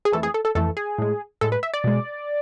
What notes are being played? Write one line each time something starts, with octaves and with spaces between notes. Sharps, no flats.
G#4
F2 E3 A3 A4
G#4
A4
A4
F2 E3 A3 A4
G#4
A2 G#3
A2 G#3 A4
B4
E5
D5
B2 G#3